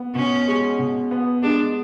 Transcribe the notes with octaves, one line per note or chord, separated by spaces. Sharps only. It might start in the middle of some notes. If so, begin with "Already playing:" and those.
Already playing: B3
B2 C#4
G#3
B2
B3
G#3 D4